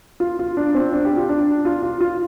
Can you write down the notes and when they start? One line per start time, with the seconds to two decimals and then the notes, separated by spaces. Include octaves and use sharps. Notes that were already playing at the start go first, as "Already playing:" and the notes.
0.20 F4
0.39 F4
0.57 D4
0.74 C4
0.93 D4
1.05 G4
1.17 F4
1.29 D4
1.65 F4
1.83 F4
2.01 F4